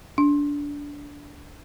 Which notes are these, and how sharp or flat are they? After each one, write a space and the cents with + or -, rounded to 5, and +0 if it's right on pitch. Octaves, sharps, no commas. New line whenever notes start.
D4 -20